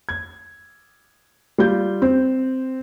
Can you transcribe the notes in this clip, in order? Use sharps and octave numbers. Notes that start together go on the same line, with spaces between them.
G#6
G3 F4 G6
C4